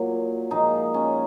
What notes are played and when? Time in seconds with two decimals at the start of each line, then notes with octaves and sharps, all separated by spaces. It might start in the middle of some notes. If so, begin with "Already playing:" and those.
Already playing: A#2 F#3
0.51 A#2 F3 G#3 D#4
0.94 C#4